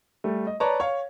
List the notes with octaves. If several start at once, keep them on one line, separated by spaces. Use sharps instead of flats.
G3 A3
D#5
B4 C#5 D5 A5 A#5
C#5 F5